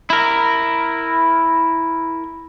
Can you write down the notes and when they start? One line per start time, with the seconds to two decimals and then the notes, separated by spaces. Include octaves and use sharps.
0.10 E4 A#4